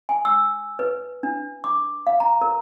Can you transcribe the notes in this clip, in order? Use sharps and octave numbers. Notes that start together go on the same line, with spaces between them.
G#5
E6
B4
D4
D6
F5
A#5
A#4